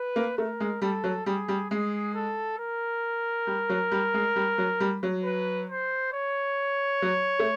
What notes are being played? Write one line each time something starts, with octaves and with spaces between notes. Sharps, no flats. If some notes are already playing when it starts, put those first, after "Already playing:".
Already playing: B4
A#3
A3 A#4
G#3
G3 A4
F#3
G3 G#4
G3
G#3 G#4
A4
A#4
G3
F#3
G3
G#3
G3
F#3
G3
F#3
B4
C5
C#5
F#3
A3